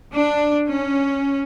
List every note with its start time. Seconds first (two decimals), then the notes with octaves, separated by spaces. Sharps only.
0.15 D4
0.69 C#4